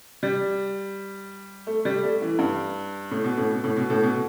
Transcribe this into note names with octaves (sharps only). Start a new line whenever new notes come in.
G3
A3
G3
A3
E3
G2
A2
B2
A2
B2
A2
B2
A2
B2